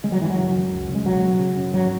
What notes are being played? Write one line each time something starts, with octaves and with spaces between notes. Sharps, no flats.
C#3 G#3
F#3
F#2 E3
F#3
C#3
F#2
C#2
C#3
G#3
B1 F#3
B2
C#3
F#2
G#1 F#3